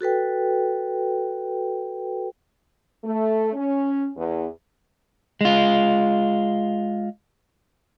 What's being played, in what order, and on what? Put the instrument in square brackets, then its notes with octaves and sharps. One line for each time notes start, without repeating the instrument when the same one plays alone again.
[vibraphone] F#4 A4 B4 G5
[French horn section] A3
C#4
E2
[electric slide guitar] G#3 F4